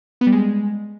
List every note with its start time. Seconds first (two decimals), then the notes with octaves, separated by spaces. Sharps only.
0.21 B3
0.27 G3
0.32 G#3